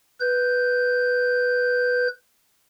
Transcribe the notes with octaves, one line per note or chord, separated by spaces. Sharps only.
B4 G6